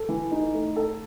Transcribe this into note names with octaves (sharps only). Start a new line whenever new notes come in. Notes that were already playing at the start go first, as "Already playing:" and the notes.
Already playing: A4
E3
D#4
A3
A4